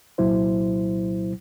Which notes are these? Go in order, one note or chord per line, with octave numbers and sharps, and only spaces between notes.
C2 A#2 F#3 E4 C5